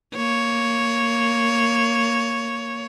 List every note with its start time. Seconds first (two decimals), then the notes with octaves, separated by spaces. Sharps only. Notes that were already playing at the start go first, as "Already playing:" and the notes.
0.15 A#3 C#5